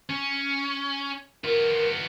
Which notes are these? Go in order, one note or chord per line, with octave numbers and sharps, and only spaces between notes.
C#4
B3 F4 A#4